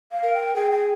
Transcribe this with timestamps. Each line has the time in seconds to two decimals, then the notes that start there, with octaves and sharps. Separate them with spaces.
0.12 F5
0.23 A#4
0.34 G5
0.55 G#4 G5
0.71 G5